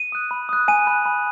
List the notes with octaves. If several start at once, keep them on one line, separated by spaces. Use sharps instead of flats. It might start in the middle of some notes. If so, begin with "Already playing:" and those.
Already playing: D#7
D#6 F#6
B5
D#6 F#6
G#5 D#7
B5 F#6
B5